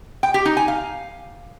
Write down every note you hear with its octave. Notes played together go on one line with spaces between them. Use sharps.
G5
G4
D#4
G#5
F5